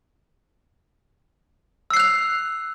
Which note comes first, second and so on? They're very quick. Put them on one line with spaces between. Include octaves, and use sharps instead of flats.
E6 C7 F#6 F7